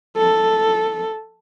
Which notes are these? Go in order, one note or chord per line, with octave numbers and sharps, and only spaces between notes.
A4